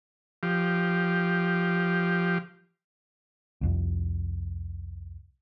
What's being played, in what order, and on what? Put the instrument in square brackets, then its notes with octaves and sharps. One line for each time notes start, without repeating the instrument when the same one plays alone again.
[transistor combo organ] F3 G4
[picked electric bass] C2 F2